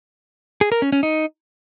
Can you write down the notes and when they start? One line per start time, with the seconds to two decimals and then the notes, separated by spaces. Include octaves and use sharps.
0.61 G#4
0.72 A#4
0.82 C#4
0.92 C#4
1.03 D#4